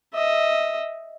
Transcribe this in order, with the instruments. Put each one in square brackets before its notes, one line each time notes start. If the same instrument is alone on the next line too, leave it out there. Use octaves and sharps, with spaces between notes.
[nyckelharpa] D#5 E5